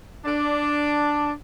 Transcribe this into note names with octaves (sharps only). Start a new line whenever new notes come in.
D4